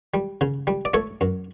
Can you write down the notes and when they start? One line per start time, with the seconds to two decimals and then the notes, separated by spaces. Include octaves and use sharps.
0.14 G3
0.41 C#3
0.67 G3
0.85 D5
0.94 A3 A4 C#5
1.21 F#2